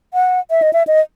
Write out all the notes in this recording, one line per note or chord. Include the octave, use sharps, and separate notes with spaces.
F#5
E5
D#5
E5
D#5